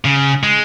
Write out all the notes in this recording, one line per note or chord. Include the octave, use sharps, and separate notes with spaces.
C#3
G#3